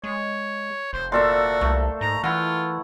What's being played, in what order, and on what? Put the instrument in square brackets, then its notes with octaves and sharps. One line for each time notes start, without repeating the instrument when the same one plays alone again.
[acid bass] G#3 [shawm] C#5
[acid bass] F1 [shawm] C5
[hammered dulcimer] A#2 A4 E5 [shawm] F#4 [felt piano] D5 C6
[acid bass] C2 [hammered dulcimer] A3
[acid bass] G#2 [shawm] A#5
[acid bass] E3 [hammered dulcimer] E4 F#5 [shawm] F4